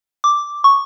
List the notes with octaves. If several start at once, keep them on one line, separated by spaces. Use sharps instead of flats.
D6
C#6